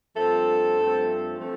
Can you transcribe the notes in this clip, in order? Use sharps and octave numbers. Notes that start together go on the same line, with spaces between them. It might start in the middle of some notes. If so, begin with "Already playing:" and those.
G2 F3 A3 C4 A4
G2 F3 A3 C4
F3 A3 C4